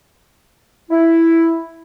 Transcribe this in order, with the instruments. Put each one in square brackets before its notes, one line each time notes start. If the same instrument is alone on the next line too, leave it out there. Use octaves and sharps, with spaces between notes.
[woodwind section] E4